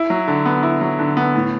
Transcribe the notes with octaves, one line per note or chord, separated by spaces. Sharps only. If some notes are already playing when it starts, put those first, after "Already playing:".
Already playing: E4
F#3
D3
B3
E4
F#3
D3
B3
A2